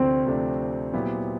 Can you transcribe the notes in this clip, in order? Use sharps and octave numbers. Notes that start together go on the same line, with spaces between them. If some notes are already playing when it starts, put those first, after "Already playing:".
Already playing: D2 C3 F3 A3 C4 D4
D2 C3 F3 A3 D4
A#2 F#3 B3 E4 G4